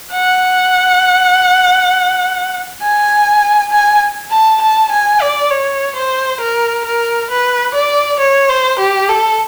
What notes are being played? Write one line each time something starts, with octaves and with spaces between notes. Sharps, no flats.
F#5
G#5
G#5
A5
A5
G#5
D5
C#5
C5
A#4
A#4
B4
D5
C#5
C5
G4
A4